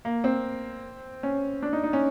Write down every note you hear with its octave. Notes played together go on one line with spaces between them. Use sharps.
A#3
C4
C#4
D4
D#4
D#4
C#4